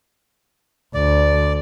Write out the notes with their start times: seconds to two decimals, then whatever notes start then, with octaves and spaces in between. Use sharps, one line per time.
0.94 D2 D5